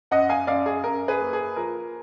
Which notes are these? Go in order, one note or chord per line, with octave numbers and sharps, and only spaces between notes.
F#2 D#5 F#5
F5 G#5
F#2 D5 F5
G#4
F#2 A#4
G#4 B4
A#3
G#4
F3 A#4